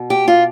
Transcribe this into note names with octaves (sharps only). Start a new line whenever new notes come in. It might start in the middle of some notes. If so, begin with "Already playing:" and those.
Already playing: B2
G4
F4